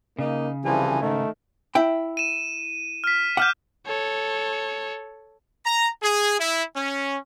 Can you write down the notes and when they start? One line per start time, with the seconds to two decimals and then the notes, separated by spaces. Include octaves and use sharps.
0.19 C#3 A#3 D#4
0.65 C2 E3 F3 G#4
1.01 G#2 D#3 A3
1.75 E4 G5
2.17 D#7 E7
3.04 F6 B6
3.37 F#5 D6 F6 G6
3.87 A4 C#5
5.65 A#5
6.02 G#4
6.39 E4
6.76 C#4